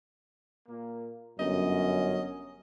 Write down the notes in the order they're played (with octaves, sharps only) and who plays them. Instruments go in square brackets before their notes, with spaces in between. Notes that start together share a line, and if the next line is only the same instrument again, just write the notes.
[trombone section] A#2 A#3
[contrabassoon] G1 [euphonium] F#2 [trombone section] C#4 [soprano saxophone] D#5